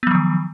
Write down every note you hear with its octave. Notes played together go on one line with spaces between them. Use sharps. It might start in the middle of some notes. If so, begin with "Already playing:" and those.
D#3 F3 F#3 B3